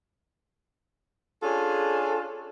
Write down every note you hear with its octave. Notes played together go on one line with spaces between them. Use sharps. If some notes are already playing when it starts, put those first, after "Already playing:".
C#4 D4 F4 G#4 A4